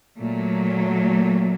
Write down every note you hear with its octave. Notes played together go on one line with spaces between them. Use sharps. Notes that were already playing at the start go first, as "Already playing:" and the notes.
A#2 F#3 A3